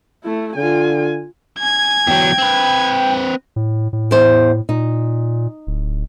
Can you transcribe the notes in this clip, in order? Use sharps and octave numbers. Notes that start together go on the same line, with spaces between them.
A3 E4
D3 F4 G#5
G#5 G#6
E2 F#3 G5
C4 B4
A2
A2
E2 C5
A#2 D#4
D1